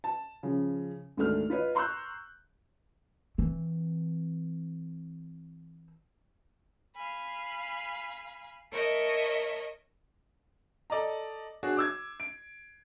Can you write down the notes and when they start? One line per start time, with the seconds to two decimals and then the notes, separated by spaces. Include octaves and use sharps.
0.04 A5
0.43 C#3 F3 C#4
1.17 D2 G#2 D#3 A3 D4 F6
1.50 F4 B4 C#5 D#5
1.75 A#5 C6 C#6 E6 F#6 G6
3.38 E3 C4
6.97 F5 G#5 B5
8.72 A#4 C#5 D#5 E5 A5
10.90 A4 D5 D#5 A#5
11.63 D4 F#4 G#4 C#5
11.77 D6 E6 G#6
12.20 D7